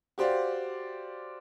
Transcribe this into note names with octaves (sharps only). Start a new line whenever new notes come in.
F#4 G4 C5 D5 F5